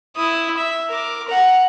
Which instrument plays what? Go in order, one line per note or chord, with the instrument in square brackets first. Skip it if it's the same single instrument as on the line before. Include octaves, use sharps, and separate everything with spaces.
[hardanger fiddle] E4 D#6
E5
A#4 D6
F#5 A#5